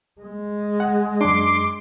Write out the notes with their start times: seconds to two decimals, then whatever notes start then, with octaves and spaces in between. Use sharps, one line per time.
0.21 G#3
0.80 F#5
1.21 F#2 D4 C6 D6